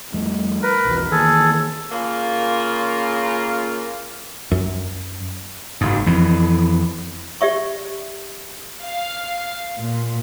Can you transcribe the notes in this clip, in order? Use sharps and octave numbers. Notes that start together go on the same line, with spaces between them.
F2 G3 A3
A#4 B4
B1 E2
D#3 E3 A#3 G#4 A4
C#3 A#3 F4
F#2
F#1 G#2
F2 E3
G4 D5 E5 C#6
F5
A#2